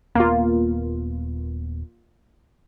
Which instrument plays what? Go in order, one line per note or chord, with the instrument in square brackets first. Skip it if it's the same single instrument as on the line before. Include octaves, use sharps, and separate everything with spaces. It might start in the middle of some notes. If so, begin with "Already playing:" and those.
[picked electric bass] D#1 B3 [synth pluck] A#3 F4